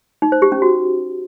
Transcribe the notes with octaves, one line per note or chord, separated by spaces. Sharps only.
D#4
C5
G4
C#4
F#4